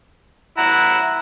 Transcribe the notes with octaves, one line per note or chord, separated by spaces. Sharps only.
E4 F#5 A#5